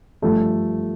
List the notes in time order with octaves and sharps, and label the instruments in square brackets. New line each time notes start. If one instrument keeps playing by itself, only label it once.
[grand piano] G2 F3 A3